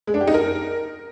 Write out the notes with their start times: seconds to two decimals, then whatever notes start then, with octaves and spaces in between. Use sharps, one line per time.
0.07 G#3
0.14 D4
0.21 G4
0.27 D#4
0.34 A#4